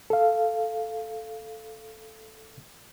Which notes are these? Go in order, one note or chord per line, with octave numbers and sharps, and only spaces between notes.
A4 F5